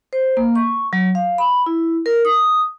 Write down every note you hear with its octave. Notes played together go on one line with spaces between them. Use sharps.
C5
A#3
C#6
F#3
F5
B5
E4
A#4
D#6